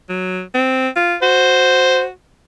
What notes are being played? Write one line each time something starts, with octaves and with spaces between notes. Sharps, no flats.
F#3
C4
F4
F#4 C5